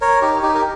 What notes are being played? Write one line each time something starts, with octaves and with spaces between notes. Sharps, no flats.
A#4 C#5
D#4 G4
D#4 G4
A#4